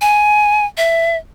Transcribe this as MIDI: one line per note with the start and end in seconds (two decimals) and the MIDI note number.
0.01 0.65 80
0.77 1.16 76